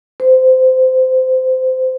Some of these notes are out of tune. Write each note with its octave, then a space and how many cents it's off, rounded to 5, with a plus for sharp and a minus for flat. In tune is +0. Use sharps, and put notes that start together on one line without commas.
C5 -20